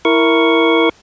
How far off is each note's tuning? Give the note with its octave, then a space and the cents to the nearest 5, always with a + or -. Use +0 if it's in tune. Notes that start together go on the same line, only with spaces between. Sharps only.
E4 +0 A#4 +0 C#6 +0